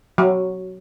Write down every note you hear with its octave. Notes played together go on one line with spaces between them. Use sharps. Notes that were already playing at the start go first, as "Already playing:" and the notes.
F#3